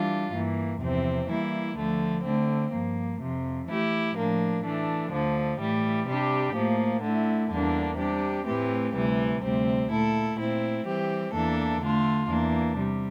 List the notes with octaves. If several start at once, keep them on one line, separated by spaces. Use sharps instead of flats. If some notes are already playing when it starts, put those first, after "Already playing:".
Already playing: E3 G3 D4 F4
G2 E3 A#3
E2 C3 F3 C4
E3 G3 A#3 E4
D2 D3 F3 A3
D3 A3 C4
G2 F3 A#3
F2 C3 F3
E3 A3 E4 G4
A2 F3 A#3 D4
E3 A3 D4
D2 D3 F3
A2 E3 G3
C3 G3 D4 G4
A2 F3 A#3
D3 A3 E4
E2 D3 G3 A#3 D4
C3 G3 D4 G4
A2 E3 A3 C4 G4
D2 C3 E3 G3
D2 C3 G3 C4
A#2 A3 E4 A4
A#2 A3 C4 E4
E3 G3 C4 G4
E2 E3 A#3 D4 A4
D3 A3 D4 F4
E2 E3 A#3 D4
C3 G3